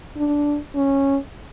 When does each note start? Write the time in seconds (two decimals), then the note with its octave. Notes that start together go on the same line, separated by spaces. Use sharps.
0.17 D4
0.75 C#4